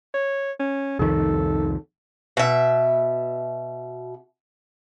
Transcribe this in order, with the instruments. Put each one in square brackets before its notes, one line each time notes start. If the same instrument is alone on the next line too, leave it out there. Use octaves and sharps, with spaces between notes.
[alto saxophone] C#5
C#4
[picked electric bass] C2 F2 D#3 [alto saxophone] A4
[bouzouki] B2 E5